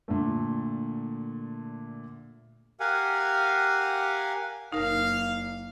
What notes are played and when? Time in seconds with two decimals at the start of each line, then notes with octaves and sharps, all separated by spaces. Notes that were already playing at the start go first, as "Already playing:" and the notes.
0.08 A#2 D3 A3
2.80 G4 A#4 F5 F#5 G#5
4.72 F#1 A#3 D#4 A#4 F5